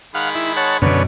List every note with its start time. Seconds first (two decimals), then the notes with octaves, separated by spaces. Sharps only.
0.15 D#3 G#3 F5 F#5 B5
0.35 E4
0.57 C#5 F#5 A5
0.82 F#2 B2 D3 B3 C#4